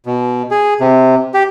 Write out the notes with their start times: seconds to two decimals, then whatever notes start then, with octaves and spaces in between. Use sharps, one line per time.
0.06 B2
0.51 G#4
0.80 C3
1.34 G4